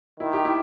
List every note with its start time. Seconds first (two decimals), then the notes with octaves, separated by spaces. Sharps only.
0.20 D#3 E4
0.33 G4
0.45 E4